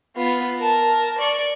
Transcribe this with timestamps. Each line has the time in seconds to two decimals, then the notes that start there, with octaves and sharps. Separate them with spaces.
0.16 B3 F4
0.59 A#4 A5
1.18 D5 C#6